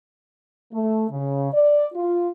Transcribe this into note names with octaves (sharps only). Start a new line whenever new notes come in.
A3
C#3
D5
F4